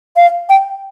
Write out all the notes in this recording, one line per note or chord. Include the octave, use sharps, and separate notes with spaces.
F5
G5